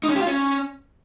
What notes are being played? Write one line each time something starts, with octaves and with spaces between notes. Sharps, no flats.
D#4
C#4
G4
F4
C#4